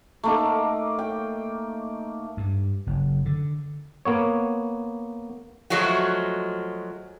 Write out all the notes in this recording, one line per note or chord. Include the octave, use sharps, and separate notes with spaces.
A3 A#3 D#4
G5
G2
F#1
D3
A#3 B3 C#5
F3 F#3 G#3 A3 F#4